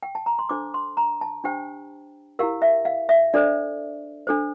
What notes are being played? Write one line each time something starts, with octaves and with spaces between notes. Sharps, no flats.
G5
A5
A#5
C6
D4 A4 C5 D6
C6
A#5
A5
D4 G4 C5 G5
E4 G4 A#4 F5
E5
F5
E5
D4 A4 C5 D5
D4 A4 C5